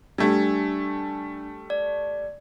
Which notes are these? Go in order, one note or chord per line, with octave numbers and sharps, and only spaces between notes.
G3 A3 D4
D5